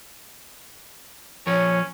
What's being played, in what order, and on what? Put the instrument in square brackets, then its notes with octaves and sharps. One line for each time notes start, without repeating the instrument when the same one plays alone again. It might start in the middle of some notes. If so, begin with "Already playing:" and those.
[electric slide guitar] F3 A#4 [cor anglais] C#4 [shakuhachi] C#5